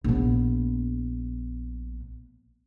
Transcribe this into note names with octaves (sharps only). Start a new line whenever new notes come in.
A#1 B3